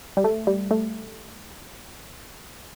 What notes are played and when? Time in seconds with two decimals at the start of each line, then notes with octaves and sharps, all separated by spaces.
0.17 G3
0.24 A3
0.47 G3
0.71 A3